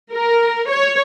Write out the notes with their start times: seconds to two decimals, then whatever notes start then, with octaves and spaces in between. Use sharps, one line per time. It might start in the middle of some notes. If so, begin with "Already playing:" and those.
0.13 A#4
0.69 C#5